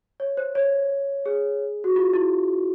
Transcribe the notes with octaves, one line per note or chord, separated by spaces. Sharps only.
C#5
C5
C#5
G#4
F#4
F4
E4